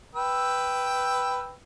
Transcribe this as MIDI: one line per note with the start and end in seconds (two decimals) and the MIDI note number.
0.15 1.53 71
0.15 1.53 79
0.15 1.53 88